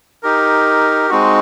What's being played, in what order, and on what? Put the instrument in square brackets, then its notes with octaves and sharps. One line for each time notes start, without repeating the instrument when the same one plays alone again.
[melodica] D#4 G4 A#4
G#3 C4 D#4 F#4